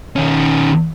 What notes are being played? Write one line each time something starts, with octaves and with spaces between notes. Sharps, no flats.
D#3 C#4